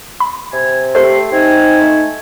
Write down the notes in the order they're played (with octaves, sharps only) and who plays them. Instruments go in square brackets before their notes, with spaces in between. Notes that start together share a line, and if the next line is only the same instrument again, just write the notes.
[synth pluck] B5
[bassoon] C3 [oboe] G#5
[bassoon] A3 [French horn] G4 [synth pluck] A4 C5 [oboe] C6
[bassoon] C4 [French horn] D#4 [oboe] G#5
[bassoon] A3